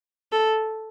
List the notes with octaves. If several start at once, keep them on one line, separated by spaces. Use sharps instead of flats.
A4